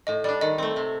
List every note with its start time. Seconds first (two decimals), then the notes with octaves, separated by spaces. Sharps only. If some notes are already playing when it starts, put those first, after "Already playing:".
0.07 A2 D#5
0.24 G3 D4 D5
0.41 D#3 D#5
0.58 A3 C4
0.76 C3